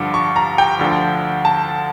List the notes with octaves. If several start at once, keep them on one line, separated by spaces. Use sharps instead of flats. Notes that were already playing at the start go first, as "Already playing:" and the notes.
Already playing: G2 D3 F3 D6
C#6
A#5
G5
D2 D3 F3
A5